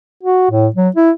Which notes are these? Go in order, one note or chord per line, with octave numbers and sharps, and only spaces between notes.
F#4
A2
F#3
E4